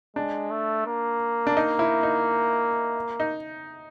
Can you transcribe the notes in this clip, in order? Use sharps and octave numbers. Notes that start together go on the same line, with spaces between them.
G#3 D4
A3
A#3
D4
D#4
E4
D#4
D#4